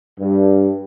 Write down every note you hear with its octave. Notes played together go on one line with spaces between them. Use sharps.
G2